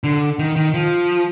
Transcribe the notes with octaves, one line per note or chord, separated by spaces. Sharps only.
D3
D#3
D#3
F3